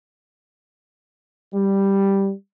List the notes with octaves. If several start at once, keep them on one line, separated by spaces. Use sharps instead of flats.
G3